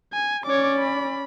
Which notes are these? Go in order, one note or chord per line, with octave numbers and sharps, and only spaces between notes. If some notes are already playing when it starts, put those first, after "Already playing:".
G#5
C#4 C#5 D5 D6
B5